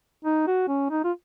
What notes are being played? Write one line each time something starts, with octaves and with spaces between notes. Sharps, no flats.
D#4
F#4
C#4
D#4
F4